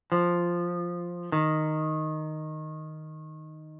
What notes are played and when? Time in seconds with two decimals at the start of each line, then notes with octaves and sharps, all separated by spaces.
0.12 F3
1.32 D#3